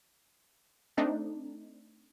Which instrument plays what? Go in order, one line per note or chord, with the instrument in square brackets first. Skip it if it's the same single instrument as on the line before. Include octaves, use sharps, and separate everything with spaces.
[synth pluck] A3 C4 D4 D#4